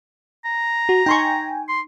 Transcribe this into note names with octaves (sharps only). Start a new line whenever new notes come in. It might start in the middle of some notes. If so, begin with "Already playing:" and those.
A#5
F#4
D#4 G5 G#5 C6 C#6
C6